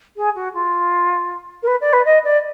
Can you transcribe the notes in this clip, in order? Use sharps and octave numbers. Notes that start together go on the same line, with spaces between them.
G#4
F#4
F4
A#4
B4
D5
B4
D#5
D5